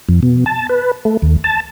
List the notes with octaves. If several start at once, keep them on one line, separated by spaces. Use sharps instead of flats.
F2
B2
A5
B4
A3
D#2
A5